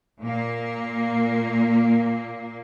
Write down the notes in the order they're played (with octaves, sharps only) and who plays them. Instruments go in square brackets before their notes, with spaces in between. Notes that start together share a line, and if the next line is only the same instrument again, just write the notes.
[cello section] A#2 A#3